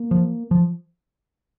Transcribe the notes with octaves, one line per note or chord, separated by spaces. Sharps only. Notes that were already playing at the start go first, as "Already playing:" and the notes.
Already playing: A#3
F3
F3